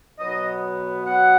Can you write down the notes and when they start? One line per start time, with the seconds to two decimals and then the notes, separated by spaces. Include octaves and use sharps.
0.18 B2 F#3 B3 D#5
1.04 B2 F#3 B3 F#5